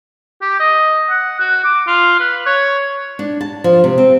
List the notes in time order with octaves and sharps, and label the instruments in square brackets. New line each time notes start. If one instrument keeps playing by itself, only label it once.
[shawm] G4
D#5
F#5
F#4
D6
F4
B4
C#5
[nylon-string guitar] D4
A5
F3
C3
C4